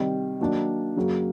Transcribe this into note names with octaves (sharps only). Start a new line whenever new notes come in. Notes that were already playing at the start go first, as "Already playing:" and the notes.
Already playing: C3 D#3 G3
D#3 F#3 A#3 D4
F#2 C#3 F#3 A#3